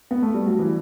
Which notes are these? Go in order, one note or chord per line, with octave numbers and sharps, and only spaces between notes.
B3
A3
G3
F#3
E3